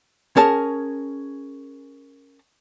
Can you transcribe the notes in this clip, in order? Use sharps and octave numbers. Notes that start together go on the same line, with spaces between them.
C#4 G#4 A#4 A5